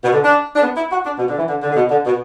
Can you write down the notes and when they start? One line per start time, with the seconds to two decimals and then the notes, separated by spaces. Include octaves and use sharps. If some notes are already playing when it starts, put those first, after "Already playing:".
0.03 B2
0.13 D3
0.24 D4
0.56 D4
0.61 B3
0.76 E4
0.90 F#4
1.05 D4
1.19 B2
1.29 D3
1.38 E3
1.48 D3
1.61 D3
1.71 D3
1.76 B2
1.90 D3
2.05 B2